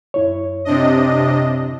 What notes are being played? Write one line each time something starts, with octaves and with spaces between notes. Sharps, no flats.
F#2 E4 C#5
C3 D4 D#5